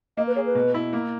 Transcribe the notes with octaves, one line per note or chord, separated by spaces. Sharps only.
A#3 D#5
B4
G#4 C#5
B4
B2
E4
A#3